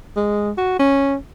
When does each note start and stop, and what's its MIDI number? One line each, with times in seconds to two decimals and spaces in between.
0.16 0.51 56
0.58 0.76 66
0.79 1.16 61